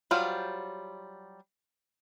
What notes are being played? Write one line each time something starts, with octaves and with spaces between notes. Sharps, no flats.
F#3 G3 F4 C5